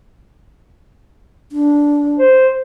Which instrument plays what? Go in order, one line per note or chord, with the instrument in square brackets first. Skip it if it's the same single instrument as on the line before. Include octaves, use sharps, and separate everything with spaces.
[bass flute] D4
[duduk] C5